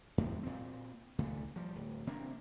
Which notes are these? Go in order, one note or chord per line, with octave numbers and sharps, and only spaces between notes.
E2 A2 C3 E3
A#2 C4
C#2 A#2 D3 A3
F3 G3
D1
C3 A#3 C4 D4